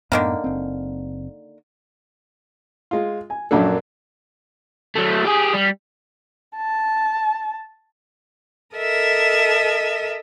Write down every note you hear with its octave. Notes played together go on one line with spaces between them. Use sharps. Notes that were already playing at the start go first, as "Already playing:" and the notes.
F#2 A2 D3 D#3 A#3 B3
F#1 C4
G#3 F4
G#5
A#1 F#2 F#3 A#3 D4 A4
F#3 A3
G4 G#4
G3
A5
A4 A#4 D#5 E5